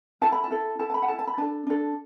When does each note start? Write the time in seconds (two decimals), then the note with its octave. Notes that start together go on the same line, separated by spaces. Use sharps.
0.21 E4 A4 A5
0.32 B5
0.44 A5
0.51 E4 A4
0.79 E4 A4 A5
0.90 A5
0.94 B5
1.02 F#5
1.08 E4 A4 A5
1.19 A5
1.27 B5
1.38 D4 A4 A5
1.67 D4 A4